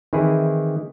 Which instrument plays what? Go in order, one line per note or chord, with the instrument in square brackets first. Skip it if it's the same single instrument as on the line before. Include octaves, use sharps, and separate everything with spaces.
[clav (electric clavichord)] D#3 E3 C4 E4 G#4